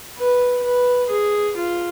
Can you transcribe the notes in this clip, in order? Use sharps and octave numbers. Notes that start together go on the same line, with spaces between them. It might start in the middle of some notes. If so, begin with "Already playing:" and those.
B4
B4
G#4
F4